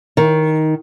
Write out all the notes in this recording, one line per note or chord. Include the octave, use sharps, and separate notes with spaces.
D#3